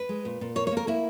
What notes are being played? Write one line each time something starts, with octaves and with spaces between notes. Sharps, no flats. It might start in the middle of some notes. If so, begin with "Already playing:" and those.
Already playing: B4
G#3
A#2
A#2
A#3 C#5
C#5
A#3
A#4
A#3 E4